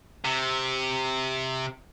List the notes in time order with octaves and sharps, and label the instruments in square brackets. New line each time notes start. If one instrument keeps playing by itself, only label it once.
[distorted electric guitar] C3